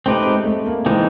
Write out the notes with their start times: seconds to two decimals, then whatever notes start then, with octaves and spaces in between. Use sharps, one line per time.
0.06 A3 C4 D#4 G4 B4
0.26 G#3
0.45 A3
0.66 A#3
0.86 E3 G#3 A3 C4 D#4